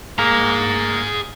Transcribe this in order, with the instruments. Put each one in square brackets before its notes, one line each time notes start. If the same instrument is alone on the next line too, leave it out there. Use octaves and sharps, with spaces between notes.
[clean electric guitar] A#3 [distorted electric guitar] G#4 A#5